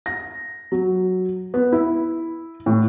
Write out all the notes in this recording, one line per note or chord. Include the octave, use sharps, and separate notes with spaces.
A#6
F#3
B3
E4
A2